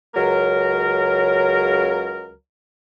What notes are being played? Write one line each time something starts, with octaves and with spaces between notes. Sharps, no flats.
C#2 C#3 F#3 A#4